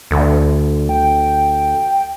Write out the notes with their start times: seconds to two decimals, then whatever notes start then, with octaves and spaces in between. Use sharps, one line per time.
0.11 D2 D3
0.89 G5